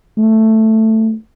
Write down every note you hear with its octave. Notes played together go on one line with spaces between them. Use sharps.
A3